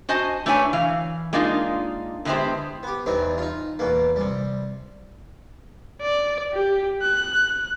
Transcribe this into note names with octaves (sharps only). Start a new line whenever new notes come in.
F#4 C5 D#5 G#5 A5
A3 D4 E4 B4 C#5 G#5
E3 F5
G#3 A#3 D4 D#4 F4
D3 G#3 B3 E4 G4 C5
B3 G4
E2 G2 E3 C4 D#4
D#4 F4
E2 B2 A#3
C3 G3
D5
G4
F#6